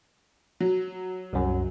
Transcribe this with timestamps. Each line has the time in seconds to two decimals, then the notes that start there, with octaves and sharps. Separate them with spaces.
0.60 F#3
1.33 C2 F#2